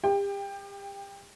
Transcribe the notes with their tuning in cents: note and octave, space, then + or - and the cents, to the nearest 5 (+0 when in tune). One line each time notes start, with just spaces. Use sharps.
G4 +35 G5 +20